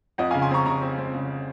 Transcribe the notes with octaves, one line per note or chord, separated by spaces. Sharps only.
F2 D#5 F#5
C#3 F5 G#5
G#5 C6
C4 A#5 C#6
C#3 A#5 C#6
C4
C4
C#3